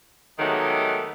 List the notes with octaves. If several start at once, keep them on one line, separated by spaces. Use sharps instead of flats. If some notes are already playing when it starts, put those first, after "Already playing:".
D#3 F#3 G#3 A3 B3 G4